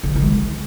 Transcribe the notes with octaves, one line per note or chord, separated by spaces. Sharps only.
D3
C#3
D#3
G#3